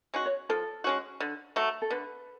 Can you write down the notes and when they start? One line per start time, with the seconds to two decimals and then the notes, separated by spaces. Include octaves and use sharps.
0.14 G#3 C#4 F#4
0.26 C#5
0.49 F3 A4
0.84 G#3 C#4 F#4
1.20 D3
1.56 F#3 A3
1.82 A4
1.90 D3 B4